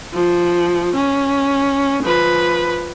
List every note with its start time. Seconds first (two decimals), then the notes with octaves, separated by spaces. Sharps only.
0.13 F3
0.95 C#4
2.03 F3 B4